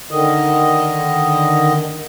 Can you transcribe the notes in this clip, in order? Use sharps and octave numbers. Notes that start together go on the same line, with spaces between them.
D3 D#3 D#5